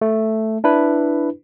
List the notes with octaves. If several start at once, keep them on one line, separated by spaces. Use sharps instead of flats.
A3
D4 E4 B4